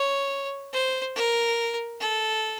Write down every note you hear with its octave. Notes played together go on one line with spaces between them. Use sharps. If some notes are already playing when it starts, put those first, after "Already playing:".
Already playing: C#5
C5
A#4
A4